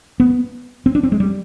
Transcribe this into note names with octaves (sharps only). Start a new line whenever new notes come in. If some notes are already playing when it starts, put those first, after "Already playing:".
B3
C4
D4
C4
G#3
G3